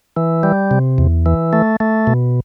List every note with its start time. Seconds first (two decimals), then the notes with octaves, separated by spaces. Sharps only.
0.17 E3
0.43 G3
0.71 C3
0.98 E2
1.26 E3
1.53 A3
1.80 A3
2.07 B2